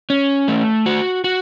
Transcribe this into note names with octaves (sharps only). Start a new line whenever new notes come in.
C#4
A3
F#4
F#4